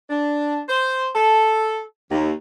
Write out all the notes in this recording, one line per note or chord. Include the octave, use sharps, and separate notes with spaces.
D4
C5
A4
D#2